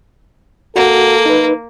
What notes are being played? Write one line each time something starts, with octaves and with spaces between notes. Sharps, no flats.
A#3 F#4 A4 F#5
D#4 B4